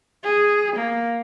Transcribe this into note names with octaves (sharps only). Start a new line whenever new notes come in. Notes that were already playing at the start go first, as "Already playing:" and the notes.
G#4
A#3